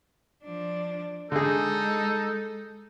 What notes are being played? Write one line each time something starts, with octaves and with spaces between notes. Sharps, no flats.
F3 D4
D3 G#3 D#4 G#4 A4